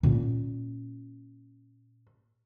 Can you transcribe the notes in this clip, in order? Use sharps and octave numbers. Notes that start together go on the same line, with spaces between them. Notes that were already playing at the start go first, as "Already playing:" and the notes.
A#2 C#4